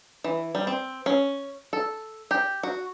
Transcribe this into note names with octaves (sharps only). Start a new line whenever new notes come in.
E3
G3
C4
C#4
A4
G4
F#4